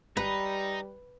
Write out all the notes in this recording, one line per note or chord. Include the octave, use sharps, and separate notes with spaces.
G#1 G3 D#4 B4